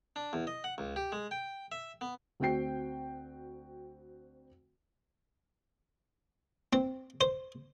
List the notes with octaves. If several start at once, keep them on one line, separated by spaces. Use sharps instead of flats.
D4
E2
D#5
F#5
C#2
G4
G#3
G5
E5
B3
D2 C4 F#4 G5 C7
C4
C5